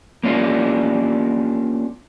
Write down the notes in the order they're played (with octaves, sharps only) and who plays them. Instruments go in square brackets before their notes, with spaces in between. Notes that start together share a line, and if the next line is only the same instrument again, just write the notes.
[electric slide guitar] A#3 C#4 D4 F4